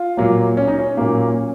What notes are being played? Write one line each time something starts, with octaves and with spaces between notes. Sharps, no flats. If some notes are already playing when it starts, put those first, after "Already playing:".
Already playing: F4
A#2 F#3 A#3
C#4
D#4
C#4
A#2 F#3 A#3